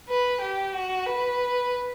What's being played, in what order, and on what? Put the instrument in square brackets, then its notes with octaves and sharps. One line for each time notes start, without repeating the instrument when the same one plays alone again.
[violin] B4
G4
F#4
B4